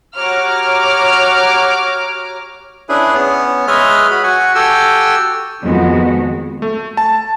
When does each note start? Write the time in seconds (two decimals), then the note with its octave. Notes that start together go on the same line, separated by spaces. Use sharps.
0.16 F#4 G4 C#5 A#5 D6 F6
2.89 C#4 D4 E4 G#4 B4
3.14 B3 C#4
3.67 G#3 B4 C#5 D#5 E5 F6
4.11 F#4 B5
4.24 F#4 F#5 G#5 C#6
4.55 F#4 G4 A4 G5 G#5 E6
5.62 F2 D#3 G#3 B3 F#4
6.62 A3
6.97 A5